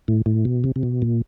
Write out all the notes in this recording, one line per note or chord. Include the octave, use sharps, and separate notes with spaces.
A2
A2
B2
C3
C3
B2
A#2